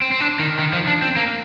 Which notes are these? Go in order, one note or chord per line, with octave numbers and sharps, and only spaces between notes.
C4
C4
D4
D#3
D#3
F3
D4
C4
A#3